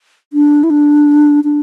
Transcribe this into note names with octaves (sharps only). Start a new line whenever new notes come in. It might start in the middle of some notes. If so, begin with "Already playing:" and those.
D4
E4
D4
D4